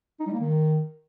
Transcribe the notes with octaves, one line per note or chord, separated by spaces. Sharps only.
D#4
G3
A#3
D#3